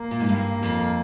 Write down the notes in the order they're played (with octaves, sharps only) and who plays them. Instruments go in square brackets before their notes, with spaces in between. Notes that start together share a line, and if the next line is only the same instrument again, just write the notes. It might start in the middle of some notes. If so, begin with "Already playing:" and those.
Already playing: [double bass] A#3
[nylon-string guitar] A#2
G#2
G2
F2